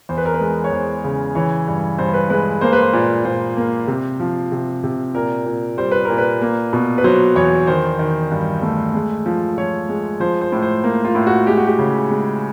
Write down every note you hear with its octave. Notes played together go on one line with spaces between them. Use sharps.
E2 C5
B4
A#4
B4
G#3
C#5
E2 C5
C#3
E3 C#5
G2
G2 C5
B4
G#3 B4
A#3 C5
B4
C5
A#2
A#2 C5
A#3
C3
F3
C3
C3
A#2 A#4
A#2
G3 C5
B4
A#2 A#4
B4
A#3
B2
B4
F#3 C5
E2 C#5
D#3 C5
D#3
G2
A3
G#3
F3
F3 C#5
G#3
F3 C5
C5
A2
C5
A#3
F4
A2
F#4
G#3 G4
F#4
G4
C#3
G#3